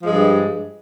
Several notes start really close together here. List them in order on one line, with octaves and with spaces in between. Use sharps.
F3 G#3 G2